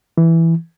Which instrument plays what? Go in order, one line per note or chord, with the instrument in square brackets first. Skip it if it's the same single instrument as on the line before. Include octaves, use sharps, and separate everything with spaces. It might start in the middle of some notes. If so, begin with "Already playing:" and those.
[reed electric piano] E3